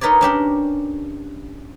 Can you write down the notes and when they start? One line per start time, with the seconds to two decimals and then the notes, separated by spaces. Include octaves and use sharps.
0.01 D#4 A#4 B4 C#5 D5
0.21 C#4 D4 G4 A#4